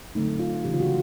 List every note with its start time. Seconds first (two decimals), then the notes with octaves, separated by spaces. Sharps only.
0.15 D3 F#3 A3 C4 D#4
0.39 F4
0.64 C#3 E3 G#3 C#4 G4
0.74 F4
0.80 F#4